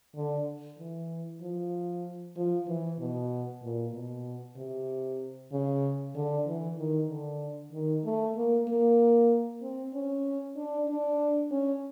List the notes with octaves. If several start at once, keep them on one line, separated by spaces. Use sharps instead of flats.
D3
E3
F3
F3
E3
B2
A#2
B2
C3
C#3
D3
E3
D#3
D3
D#3
A3
A#3
A#3
C4
C#4
D4
D4
C#4